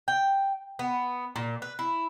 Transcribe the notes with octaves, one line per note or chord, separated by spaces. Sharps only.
G5
B3
A#2
B4
E4